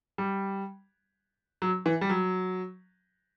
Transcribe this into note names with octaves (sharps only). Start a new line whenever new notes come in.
G3
F#3
E3
G3
F#3